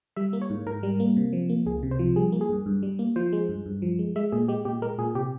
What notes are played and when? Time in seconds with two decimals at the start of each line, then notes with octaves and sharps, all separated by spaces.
0.16 G3 E5
0.33 A#3
0.42 C#5
0.50 G#2
0.66 G#2 A#4
0.83 G3
1.00 A#3
1.17 C3
1.33 F3
1.49 A#3
1.66 C#2 G#4
1.83 C3
1.91 C5
1.99 F3
2.16 G3 G#4
2.32 A#3
2.41 G#4
2.49 G2
2.66 G2
2.83 G3
2.99 A#3
3.16 F3 C5
3.33 G#3
3.49 G2
3.66 G2
3.82 F3
3.99 G#3
4.16 G#3 E5
4.32 A#2 G#4
4.48 G#3 G4
4.65 A#2 G4
4.82 G#3 A#4
4.99 A#2 G#4
5.15 C3 G4